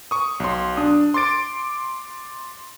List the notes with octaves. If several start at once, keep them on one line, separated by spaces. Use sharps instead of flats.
C#6 D#6
B1 C6
D4 D#6
C6 D6 A6 D7